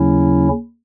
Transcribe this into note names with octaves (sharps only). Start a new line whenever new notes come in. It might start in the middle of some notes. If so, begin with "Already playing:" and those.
Already playing: D#2 C#3 F#3 C#4 E4